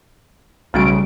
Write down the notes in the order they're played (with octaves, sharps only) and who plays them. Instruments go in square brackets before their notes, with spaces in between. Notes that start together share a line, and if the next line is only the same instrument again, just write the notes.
[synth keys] B1 C#3 D7 [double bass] G3 [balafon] A3 C#4 F#4